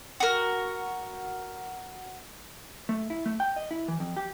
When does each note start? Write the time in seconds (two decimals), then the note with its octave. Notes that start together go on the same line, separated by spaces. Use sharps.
0.20 F#4 A#4
2.89 A3
3.10 E4
3.26 A3
3.40 G5
3.56 D#5
3.71 E4
3.88 E3
4.00 F2
4.17 G4